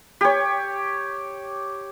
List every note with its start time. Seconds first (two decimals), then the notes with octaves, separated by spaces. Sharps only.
0.21 G4 C#5